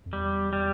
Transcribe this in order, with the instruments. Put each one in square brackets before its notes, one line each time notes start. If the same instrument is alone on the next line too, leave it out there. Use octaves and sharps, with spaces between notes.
[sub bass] F2
[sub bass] E2 [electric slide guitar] G3
[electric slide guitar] G3